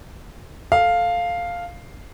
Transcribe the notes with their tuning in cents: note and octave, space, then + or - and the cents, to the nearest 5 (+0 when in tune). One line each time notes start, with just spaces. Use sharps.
A4 +0 F5 +0